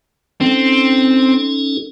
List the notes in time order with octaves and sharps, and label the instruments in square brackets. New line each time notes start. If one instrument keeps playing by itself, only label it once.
[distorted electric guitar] C4 [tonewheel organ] C#4 D#4 A4